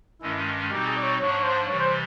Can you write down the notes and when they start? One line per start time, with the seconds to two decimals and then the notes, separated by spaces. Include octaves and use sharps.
0.22 G2 D#3 G#3 C#4 E4
0.70 B2 G3 C4 D#4 G4
0.87 G#4
0.97 D5
1.03 C#5
1.19 G#2 F3 A#3 D4 C#5
1.33 C#5
1.43 C5
1.66 C3 E3 G3 C#5
1.80 C5